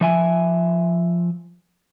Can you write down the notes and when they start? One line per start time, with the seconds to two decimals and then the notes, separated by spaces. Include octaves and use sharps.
0.01 F3 E5 G#5